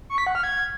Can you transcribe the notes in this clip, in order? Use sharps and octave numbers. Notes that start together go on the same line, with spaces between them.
C#6
B6
F#5
F6
G#6